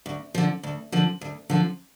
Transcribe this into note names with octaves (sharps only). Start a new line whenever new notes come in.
D2
D3 F3
D2
D3 F3
D2
D3 F3